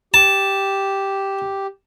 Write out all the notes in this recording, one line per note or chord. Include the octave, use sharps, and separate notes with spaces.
G4 A5